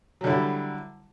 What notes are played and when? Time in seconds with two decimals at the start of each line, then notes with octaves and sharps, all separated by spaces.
0.21 F#3
0.24 D3
0.27 E4
0.30 G3